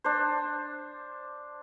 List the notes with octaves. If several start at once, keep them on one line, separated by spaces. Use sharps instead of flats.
D4 C5